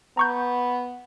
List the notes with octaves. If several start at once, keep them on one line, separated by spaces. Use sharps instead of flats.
B3 A#5 C#6 G6